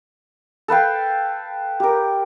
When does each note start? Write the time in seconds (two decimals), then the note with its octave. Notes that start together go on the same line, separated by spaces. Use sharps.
0.68 A4 B4 F5 G5
1.80 G4 A#4